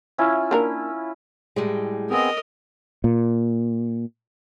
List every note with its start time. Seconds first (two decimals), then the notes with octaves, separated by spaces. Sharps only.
0.18 C#4 E4 F4
0.51 A#3 D4 A#4
1.56 A2 G3 G#3
2.10 B3 C4 G#4 A#4 D#5
3.04 A#2